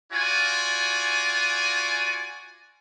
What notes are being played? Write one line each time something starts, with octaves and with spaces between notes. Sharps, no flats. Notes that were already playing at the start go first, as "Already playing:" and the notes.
F4 F#4 D5 G#5